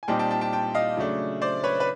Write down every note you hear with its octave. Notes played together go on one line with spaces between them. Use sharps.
G#5
A#2 G3 C4 D#4 G5 A5
G5 A5
G5 A5
G5 A5
G5 A5
D#5 F5
C#3 F#3 A3 D4
C5 D5
B4 C#5
B4